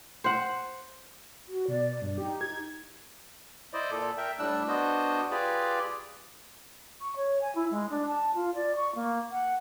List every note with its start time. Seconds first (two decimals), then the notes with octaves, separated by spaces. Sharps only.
0.24 C5 F#5
1.48 F#4
1.68 B2 D5
2.01 G2
2.18 D#4 G4
2.41 G#6
3.73 E4 C5 D5 D#5
3.91 A#2 A4
4.17 A#4 E5 G5
4.39 A2 G3 D4 E6 F#6
4.68 B3 D4 F#4 C5 D#5
5.31 F4 G4 G#4 B4 D5
7.01 C#6
7.16 C#5
7.41 G#5
7.55 E4
7.71 G#3
7.90 D4
8.08 A5
8.34 F4
8.55 D5
8.76 C#6
8.95 A#3
9.31 F#5